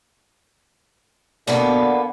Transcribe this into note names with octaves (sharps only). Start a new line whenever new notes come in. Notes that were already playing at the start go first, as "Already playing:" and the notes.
B2 D3 A#3 B3